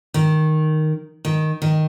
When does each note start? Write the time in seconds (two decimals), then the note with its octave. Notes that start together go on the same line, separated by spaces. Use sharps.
0.14 D#3
1.25 D#3
1.62 D#3